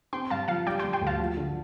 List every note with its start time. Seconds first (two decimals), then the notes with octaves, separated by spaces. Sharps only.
0.13 C4 G5 C6
0.30 G2 F5 A5
0.48 F3 F5 A5
0.67 G3 D5 G5
0.79 G5 C6
0.84 G3
0.93 G5 C6
1.01 D2
1.07 F5 A5
1.19 F3
1.37 D3